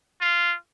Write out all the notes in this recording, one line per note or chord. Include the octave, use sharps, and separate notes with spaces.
F4